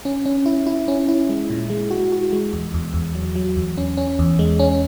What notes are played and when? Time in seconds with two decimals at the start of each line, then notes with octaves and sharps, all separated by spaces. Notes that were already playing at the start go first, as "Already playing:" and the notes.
0.05 C#4
0.26 C#4
0.46 E4
0.67 E4
0.88 C#4
1.08 E4
1.29 G#3
1.50 A#2
1.70 G#3
1.91 F#4
2.12 F#4
2.32 G#3
2.53 E2
2.74 E2
2.94 E2
3.15 F#3
3.36 F#3
3.56 E2
3.78 C#4
3.97 C#4
4.19 E2
4.39 G#3
4.59 C#4